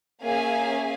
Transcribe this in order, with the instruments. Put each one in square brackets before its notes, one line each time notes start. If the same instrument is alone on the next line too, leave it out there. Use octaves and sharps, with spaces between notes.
[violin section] A#3 C#4 G#4 E5 F5 G#5